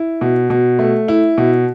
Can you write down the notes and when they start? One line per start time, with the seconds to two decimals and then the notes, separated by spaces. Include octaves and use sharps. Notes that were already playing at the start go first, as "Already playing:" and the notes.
Already playing: E4
0.21 B2
0.50 B2
0.79 A3
1.08 E4
1.38 B2